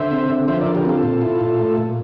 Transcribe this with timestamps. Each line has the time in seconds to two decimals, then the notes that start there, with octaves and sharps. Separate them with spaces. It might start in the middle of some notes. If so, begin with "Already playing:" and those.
Already playing: D3 C5 E5
0.11 C4
0.30 D3
0.48 F3 C5 E5
0.61 A#4 D5
0.66 D3
0.75 G4 A#4
0.85 C4 F4 A4
1.03 A#2
1.22 E4
1.41 A#2
1.59 A3
1.77 A#2